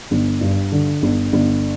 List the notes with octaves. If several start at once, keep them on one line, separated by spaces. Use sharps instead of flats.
G1
G2
D3
G1
G1